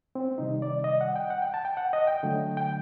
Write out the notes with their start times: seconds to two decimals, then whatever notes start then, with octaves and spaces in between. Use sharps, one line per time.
0.15 C4
0.38 C3 D#3 G3 D#4
0.62 D5
0.84 D#5
1.01 F#5
1.16 G5
1.30 F#5
1.42 G5
1.54 A5
1.65 G5
1.77 F#5
1.93 D#5
2.07 G5
2.23 D3 F#3 A3
2.57 G5